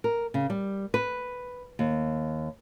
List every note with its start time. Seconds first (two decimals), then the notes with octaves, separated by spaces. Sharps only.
0.04 A#4
0.34 C#3
0.50 G3
0.94 B4
1.79 D#2